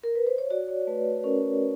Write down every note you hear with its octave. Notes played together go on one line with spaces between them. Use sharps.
A#4
B4
C5
C#5
F#4 D5
C#5
A3 B4
C#4 A#4